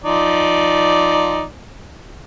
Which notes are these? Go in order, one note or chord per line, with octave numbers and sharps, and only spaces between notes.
F3 D#4 D5